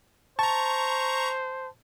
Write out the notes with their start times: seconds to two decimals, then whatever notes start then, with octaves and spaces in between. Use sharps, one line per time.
0.39 C5 A5 A#5 C#6